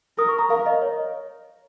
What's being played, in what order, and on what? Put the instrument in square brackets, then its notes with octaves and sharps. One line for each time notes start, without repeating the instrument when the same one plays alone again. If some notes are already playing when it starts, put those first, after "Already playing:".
[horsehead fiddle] A#4 [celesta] D#6
[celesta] C#6
A#5
[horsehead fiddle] A#4 [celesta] F5
[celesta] D#5
C#5